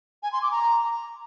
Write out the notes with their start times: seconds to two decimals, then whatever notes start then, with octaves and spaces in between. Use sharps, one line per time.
0.23 G#5
0.33 C6
0.42 D6
0.52 A#5